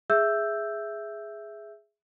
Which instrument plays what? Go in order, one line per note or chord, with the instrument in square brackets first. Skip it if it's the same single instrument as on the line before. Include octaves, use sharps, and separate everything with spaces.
[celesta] G#4 E5 E6 G6